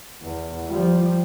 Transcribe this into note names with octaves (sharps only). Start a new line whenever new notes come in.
E2
F3 G3